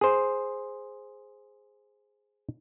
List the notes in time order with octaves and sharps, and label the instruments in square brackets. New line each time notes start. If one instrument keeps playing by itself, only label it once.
[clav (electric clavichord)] G#4 C5